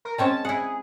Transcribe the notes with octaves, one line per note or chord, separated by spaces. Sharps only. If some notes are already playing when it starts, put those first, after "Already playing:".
A#4
G#3 C4 C#4 A5
E4 G#4 F#5